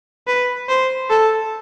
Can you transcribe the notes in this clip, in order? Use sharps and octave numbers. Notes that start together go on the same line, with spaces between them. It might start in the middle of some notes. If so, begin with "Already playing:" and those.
B4
C5
A4